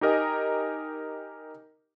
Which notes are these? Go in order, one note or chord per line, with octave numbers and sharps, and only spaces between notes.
D#4 G4 A#4 D#5 G#5